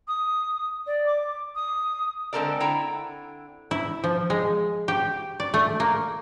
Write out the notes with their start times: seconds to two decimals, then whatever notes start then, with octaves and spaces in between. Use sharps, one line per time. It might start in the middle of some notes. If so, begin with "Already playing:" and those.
0.08 D#6
0.86 D5
1.06 D6
1.55 D#6
2.33 D3 G#3 C4 A4 A#4 D5
2.60 D3 C4 E4 G5 A#5
3.71 E4
4.04 F3
4.30 G#3
4.88 G4
5.40 D5
5.54 A3
5.80 A#3